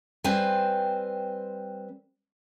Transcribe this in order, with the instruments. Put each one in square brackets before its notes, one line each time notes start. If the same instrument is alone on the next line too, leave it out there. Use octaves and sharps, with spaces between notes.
[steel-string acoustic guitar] G3 C4 B4 C5 G#5